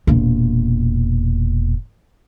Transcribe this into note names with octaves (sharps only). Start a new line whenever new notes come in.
E1 A#2